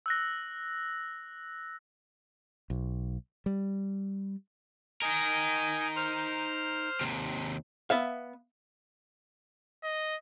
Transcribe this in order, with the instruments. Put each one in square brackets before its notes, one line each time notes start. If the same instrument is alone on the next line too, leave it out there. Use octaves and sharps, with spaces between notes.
[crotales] E6 F#6 A#6
[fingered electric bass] B1
G3
[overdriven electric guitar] D#4 A#4 [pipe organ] D#5 G#5
[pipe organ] C5 F6
[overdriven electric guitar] D#2 C3
[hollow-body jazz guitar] B3 E5 F5
[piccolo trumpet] D#5